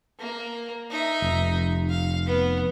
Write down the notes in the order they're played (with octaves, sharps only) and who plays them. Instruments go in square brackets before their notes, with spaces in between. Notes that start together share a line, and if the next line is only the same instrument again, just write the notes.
[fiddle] A#3
D#4 E5
[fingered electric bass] F1
[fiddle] F5
B3